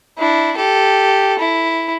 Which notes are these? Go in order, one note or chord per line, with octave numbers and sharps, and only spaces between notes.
D4 E4
G4 A4
E4